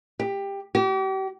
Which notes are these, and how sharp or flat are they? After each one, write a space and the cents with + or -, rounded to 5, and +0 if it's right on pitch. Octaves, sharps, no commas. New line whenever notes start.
G4 +15
G4 -40